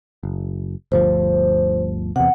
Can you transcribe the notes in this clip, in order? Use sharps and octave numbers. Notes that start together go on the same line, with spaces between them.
F#1
G1 D2 F3 C5
E2 C3 F#5